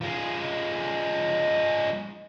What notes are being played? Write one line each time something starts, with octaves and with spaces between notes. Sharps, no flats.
F3 G#3